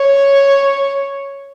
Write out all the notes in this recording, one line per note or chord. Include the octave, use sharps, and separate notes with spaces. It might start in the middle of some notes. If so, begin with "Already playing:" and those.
Already playing: C#5